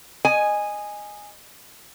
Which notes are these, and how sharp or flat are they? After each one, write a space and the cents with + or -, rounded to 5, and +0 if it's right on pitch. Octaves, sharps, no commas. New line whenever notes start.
D#5 -15 G#5 -5